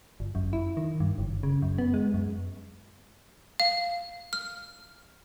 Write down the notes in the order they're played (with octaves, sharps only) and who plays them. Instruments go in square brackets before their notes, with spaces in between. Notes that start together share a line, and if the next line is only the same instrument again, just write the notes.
[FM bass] G1
F#2
E4
D#3
G2
F#1
C#3
F#2
B3
G#3
F#2
[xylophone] F5
F6